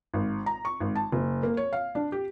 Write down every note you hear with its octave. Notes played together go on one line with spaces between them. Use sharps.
G#1
A#5
C#6
G#1
A5
F#1
A#3
C#5
F5
D4
G4